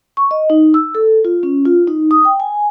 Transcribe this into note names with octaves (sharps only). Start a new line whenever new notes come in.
C#6
D#5
D#4
E6
A4
F4
C#4
F4
D#4
D#6
G5
G#5